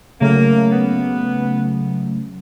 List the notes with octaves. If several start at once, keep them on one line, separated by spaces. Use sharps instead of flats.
C#3 F#3 A3 A#3
B3